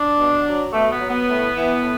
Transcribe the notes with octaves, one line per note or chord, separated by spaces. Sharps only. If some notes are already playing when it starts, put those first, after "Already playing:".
Already playing: D4
B2
F#3
B2 A3
B3
F#3
B3
A2
E3
A2